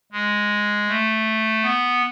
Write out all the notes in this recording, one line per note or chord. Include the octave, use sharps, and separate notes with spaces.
G#3
A3
B3